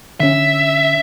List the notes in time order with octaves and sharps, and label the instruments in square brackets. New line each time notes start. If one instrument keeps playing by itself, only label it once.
[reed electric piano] D3 C#4 [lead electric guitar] E5